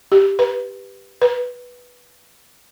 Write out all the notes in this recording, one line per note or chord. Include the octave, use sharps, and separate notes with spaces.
G4
B4
B4